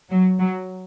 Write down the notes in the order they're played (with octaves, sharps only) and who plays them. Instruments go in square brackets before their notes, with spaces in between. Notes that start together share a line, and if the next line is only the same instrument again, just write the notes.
[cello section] F#3
F#3